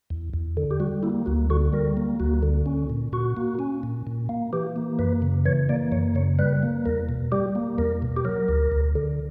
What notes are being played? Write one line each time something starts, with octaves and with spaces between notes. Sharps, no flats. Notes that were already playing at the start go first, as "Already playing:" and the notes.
E2
E2
D3
G4
G3 F#4
A#3 E4
D2 F#4
D3 F#4
G3 A#4
A#3
D2 F#4
D3
C#4
A#2
A#2 F#4
A#3
C#4
A#2
A#2
A#3
E3 G4
A#3
F#2 B4
C#3
E3 C#5
A#3 D5
F#2 C#5
C#3 C#5
G3 B4
A#3
E2 A#4
B2
G3 G4
A#3
E2 A#4
B2
G4
F#3 A#4
D2
D2
D3